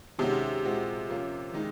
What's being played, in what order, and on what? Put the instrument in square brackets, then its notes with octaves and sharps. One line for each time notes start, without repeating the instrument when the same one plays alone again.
[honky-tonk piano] C3 [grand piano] D#3 G#3 C#4 F#4
[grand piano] A#2 G#3 C4 F#4
F3 A#3 C#4
D#3 G#3 D#4